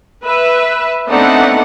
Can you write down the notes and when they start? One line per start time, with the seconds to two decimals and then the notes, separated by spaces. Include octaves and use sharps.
0.23 B4 E5
1.08 A3 B3 C4 D4 D#4 F#5